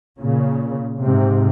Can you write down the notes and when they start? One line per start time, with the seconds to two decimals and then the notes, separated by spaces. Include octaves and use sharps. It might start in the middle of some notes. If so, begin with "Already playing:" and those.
0.20 A#2 C#3
1.00 G#2 C3